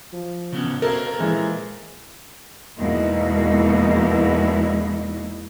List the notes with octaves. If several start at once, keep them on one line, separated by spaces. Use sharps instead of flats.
F3
C#3 B3 C#4
B2 A4 A#4 C5 F5
A#2 E3 G#3
E2 B2 G#3 A#3 D#4 E4